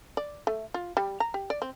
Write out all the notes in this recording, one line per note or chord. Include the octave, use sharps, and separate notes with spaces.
D5
A3
F4
G3
A#5
G4
D5
C4